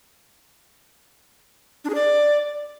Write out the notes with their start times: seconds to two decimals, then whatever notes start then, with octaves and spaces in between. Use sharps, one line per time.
1.85 D4
1.90 G#4
1.95 D5